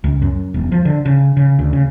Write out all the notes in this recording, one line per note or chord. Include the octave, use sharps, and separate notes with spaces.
C#2
F#2
E1
F3
D3
C#3
C#3
D2
C#3